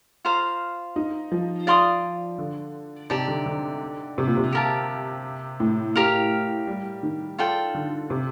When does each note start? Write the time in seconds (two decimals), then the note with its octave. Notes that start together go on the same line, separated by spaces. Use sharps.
0.25 F4 C5 F5 A#5
0.96 D#4
1.32 F3
1.67 D5 F5 C6 D#6
2.38 D3
3.10 C3 D#4 G4 D5 A5
3.28 D3
3.46 D3
4.18 C3
4.27 A#2
4.37 C3
4.53 G4 A#4 F5 A5
5.60 A2
5.96 A2 G4 A#4 F5
6.67 G3
7.03 D#3
7.39 F4 A4 D5 G5
7.75 D3
8.10 C3